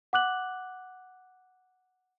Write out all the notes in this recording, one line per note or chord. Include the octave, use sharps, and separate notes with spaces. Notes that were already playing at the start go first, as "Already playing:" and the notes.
F#5 D6 F#6 F#7